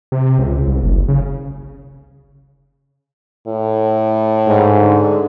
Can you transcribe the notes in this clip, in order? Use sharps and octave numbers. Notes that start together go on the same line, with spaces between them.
C3
C#2
C2
F#1
C#3
A2
G#2
D3